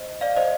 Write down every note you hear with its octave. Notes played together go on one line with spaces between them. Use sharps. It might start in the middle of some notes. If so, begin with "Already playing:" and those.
Already playing: C5 D#5
D5 F5
C5 D#5